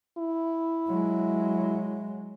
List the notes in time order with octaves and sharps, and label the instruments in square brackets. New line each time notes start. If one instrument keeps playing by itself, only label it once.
[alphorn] E4
[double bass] F#3 G#3